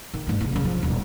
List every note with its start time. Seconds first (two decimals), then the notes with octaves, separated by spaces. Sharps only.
0.14 D#3
0.27 G2 A3
0.41 C#3 E3
0.52 F#2 C#3
0.64 F3
0.83 D#1 B1